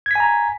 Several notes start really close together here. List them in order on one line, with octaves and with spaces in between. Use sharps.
G#6 B6 G#5 A#5